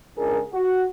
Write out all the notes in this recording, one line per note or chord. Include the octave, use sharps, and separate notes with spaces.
C#2 D4 G#4 A#4
F#4